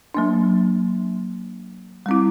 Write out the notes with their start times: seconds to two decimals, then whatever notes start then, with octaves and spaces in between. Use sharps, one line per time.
0.15 F#3 A#3 D4
2.06 G3 C4 E4